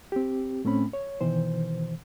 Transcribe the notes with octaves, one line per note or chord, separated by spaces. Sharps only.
C4 G4
A2 A3 C4 C#4 B5
C#5
B2 D#3 E3 C5